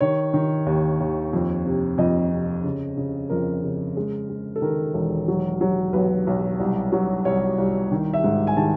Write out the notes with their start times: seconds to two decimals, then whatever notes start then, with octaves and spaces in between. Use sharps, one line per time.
0.01 D#3 C#5
0.34 D#3
0.66 D#2
1.00 D#2
1.33 F2
1.65 C3
1.98 F2 D#5
2.31 C3
2.64 C#3
2.97 C#3
3.30 F2 A#4
3.63 C#3
3.97 G#3
4.29 G#3
4.56 A4
4.62 D#3 A#4
4.94 E1
5.28 F#3
5.61 F#3
5.93 B1 B4
6.27 B1
6.59 C2
6.92 F#3
7.25 C2 C#5
7.58 C2
7.92 D#3
8.14 E5
8.24 G#2
8.47 G#5
8.57 D#3 A5